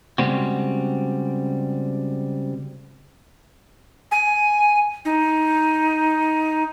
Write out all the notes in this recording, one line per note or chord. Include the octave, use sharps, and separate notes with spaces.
C#3 E3 G3 G#3 C4 F#4
G#5
D#4